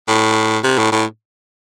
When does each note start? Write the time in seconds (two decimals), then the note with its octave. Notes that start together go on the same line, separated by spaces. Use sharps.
0.08 A2
0.64 C3
0.78 A2
0.92 A2